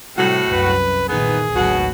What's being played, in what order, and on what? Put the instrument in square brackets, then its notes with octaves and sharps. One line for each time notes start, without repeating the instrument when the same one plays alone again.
[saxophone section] A2 F#4 [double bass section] C3 G3
[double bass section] C2 F#2 [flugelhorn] B4
[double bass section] A#2 D#3 E3 [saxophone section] B3 D#4 B4 [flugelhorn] G#4
[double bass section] G#1 D2 F#3 [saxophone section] B2 F#4